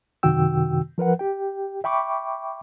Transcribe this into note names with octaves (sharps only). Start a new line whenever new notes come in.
F#2 C3 D#3 F#4 G5 E6
F3 A#4 B4 F#5
G4 G5
E5 G5 B5 C#6 D6